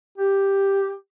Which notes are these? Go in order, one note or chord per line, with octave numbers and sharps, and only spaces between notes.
G4